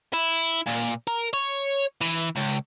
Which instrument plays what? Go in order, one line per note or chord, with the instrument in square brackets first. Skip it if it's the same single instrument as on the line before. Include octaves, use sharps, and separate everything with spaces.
[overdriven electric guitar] E4
A#2
A#4
C#5
E3
C#2